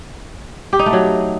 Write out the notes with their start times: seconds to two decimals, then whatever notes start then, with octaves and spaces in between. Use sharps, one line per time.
0.73 G4
0.79 D#4
0.86 A3
0.93 F#3